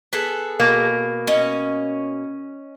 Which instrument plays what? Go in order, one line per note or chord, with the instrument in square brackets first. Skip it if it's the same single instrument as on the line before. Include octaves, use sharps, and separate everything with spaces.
[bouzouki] B3 G#4 A4
[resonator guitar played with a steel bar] B2 A#3
[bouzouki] C#4 D#5